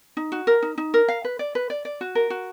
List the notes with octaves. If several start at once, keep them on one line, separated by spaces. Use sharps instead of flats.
D#4
F#4
A#4
D#4
D#4
A#4
F5
B4
D5
B4
D5
D5
F#4
A#4
F#4